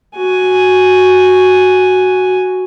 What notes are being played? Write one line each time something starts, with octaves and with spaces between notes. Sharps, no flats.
F#4 G#5